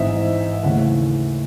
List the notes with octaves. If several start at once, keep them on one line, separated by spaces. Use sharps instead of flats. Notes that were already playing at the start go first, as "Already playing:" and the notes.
Already playing: A1 G#2 E3 C4 D#4 E5
D#2 C#3 E3 A3 F#5